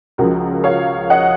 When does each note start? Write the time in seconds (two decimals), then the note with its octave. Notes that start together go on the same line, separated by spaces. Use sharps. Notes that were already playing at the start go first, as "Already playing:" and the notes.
0.18 C#2 C#3 F3 F#4 A#4
0.64 C#5 F5
1.10 D#5 F#5